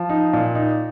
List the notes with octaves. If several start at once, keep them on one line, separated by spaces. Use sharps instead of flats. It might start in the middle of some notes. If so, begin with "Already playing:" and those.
Already playing: F3
D#4
A#2
D#4